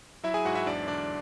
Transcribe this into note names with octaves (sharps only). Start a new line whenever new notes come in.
F#3 E4 E5
G#4 G#5
G#2 F#4 F#5
E4 E5
E2 D4 D5
D3 D4 D5